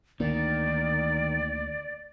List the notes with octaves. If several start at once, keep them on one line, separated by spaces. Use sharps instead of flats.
D2 D#3 A#3 D5